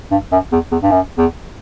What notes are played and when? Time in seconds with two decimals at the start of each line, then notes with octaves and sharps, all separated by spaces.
0.11 G2
0.32 F#2
0.52 E2
0.71 E2
0.82 G2
0.91 F#2
1.18 E2